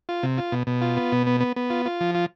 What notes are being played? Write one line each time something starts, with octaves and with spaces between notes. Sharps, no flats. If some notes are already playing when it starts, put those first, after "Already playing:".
F4
C3
F4
B2
B2
F4
B3
B2
B3
B3
B3
F4
F4
F3
F4